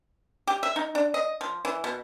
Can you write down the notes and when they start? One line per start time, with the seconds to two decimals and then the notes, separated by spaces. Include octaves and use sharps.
0.47 G4
0.63 E5
0.76 D#4
0.95 D4
1.14 D#5
1.41 F3
1.65 E3
1.84 B2